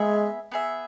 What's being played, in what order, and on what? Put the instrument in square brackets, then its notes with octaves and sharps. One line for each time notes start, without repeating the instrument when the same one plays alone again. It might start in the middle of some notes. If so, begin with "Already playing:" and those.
Already playing: [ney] G#3 [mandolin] B3 G#4 E5
[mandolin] B3 G#4 E5